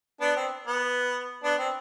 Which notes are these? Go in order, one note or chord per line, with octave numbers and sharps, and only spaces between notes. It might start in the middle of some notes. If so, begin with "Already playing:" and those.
B3 D4
C4
B3
B3 D4
C4